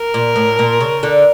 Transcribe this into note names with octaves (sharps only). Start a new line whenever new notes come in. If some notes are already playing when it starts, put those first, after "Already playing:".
Already playing: A#4
A#2
A2
A#2
C#3
D3